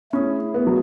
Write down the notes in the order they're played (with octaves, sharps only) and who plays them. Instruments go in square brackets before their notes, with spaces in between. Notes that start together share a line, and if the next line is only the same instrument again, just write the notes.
[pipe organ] A3 E4 G#4 [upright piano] C#4
[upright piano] B3
F#3